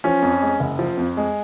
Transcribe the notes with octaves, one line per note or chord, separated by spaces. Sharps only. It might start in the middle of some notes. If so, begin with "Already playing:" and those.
F3 C#4
F2
G#3
F#1
F3
F2
G#3